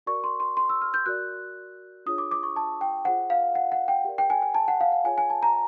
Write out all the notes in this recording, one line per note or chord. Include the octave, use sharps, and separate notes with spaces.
F#4 A#4 D5 C#6
C6
C6
C6
E6
F6
G6
F#4 A#4 D5 F#6
D4 F4 G#4 C#5 D#6
D6
D6
C#6
A5
G5
F4 G#4 C5 F#5
F5
F#5
F#5
G5
G4 A#4 D5
G5
G#5
G#5
A5
F#5
F5
F#5
F4 G#4 C#5 G#5
G#5
A5
A#5